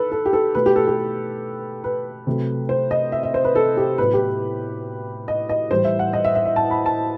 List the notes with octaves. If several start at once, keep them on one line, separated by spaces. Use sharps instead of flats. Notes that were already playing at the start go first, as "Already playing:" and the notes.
Already playing: D#3 A4 B4
A4
G4
A4
B2 A3 B4
G4
A4
G4
B4
C3 F#3 A3
C5
D#5
E5
E5
C5
B4
A4
G4
A2 F#3 B3 B4
G4
D#5
D#5
A2 E3 G3 C5
E5
F#5
D#5
E5
E5
E5
A5
B5
A5